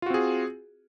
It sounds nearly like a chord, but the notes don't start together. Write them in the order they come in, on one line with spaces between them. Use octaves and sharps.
F4 F#4 C4 G#4